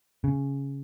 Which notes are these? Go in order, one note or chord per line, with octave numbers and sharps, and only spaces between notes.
C#3